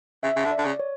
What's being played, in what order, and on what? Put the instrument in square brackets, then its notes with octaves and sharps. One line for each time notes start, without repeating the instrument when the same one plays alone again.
[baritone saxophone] C#3 [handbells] E5
[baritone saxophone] C#3
D3
[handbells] D5
[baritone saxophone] D3
C#3
[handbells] C#5